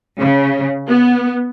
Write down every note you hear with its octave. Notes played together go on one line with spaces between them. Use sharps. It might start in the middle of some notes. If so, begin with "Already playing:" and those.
C#3
B3